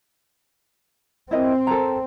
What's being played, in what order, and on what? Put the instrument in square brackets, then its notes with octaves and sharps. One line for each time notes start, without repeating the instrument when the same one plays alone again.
[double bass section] C4 [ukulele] E4 A#4 D#5
[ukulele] A4 A#4 A#5